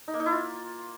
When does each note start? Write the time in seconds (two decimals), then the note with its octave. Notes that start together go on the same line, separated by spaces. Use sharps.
0.08 D#4
0.14 A#3
0.20 D#4
0.26 E4
0.32 F4